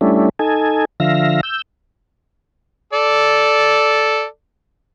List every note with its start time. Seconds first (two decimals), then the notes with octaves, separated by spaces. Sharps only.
0.01 G3 A3 C#4 D4 E4
0.39 D#4 A4 G#5
1.00 D3 F3 E5 F5 A#6
1.43 E6 G6
2.93 A4 D5